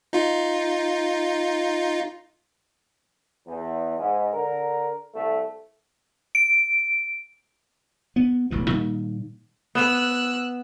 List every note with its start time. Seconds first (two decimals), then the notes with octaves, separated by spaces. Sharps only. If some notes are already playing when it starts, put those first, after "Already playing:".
0.13 D#4 F4
3.46 E2
3.98 G#2
4.33 D3 A#4
5.14 C2 A3
6.35 D7
8.16 B3
8.51 E1 A1 G2
8.70 A#2 D#3 G3 A#3
9.75 B3 E6 F#6